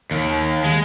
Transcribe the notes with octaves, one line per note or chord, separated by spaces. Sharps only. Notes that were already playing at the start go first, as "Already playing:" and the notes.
D#2
G#3